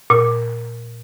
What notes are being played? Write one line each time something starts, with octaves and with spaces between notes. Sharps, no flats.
A#2